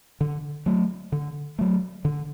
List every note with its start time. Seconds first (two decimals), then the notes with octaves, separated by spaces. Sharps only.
0.21 D3
0.66 F#3 A3
1.12 D3
1.59 F#3 A3
2.05 D3